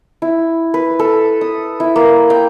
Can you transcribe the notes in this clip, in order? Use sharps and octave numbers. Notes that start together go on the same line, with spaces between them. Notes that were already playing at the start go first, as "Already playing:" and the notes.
E4
B4
A4
D#6
E4
A#3
G5